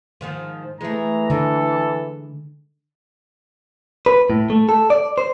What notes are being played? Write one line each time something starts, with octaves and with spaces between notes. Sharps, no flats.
G#2 D#3 F3
E3 G#3 A3 A#5
D3 G#3 D4 A4
B4
A2
A3
A4
D5
C5